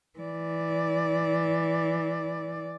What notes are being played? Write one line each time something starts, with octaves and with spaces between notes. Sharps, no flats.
E3 D5